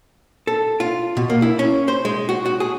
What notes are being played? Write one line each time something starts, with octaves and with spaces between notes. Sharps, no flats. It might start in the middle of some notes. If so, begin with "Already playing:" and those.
A4
F4
B2
A#3
E4
C#4
C5
G#3
F#4
F#4
G#4